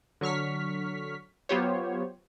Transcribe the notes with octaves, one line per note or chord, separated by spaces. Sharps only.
D3 F#3 C#6 F6 B6
F#3 B3 F4 G4 C5 C#5